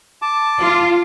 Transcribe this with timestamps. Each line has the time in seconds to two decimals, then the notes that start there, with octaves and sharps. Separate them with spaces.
0.22 A5 D6
0.60 F4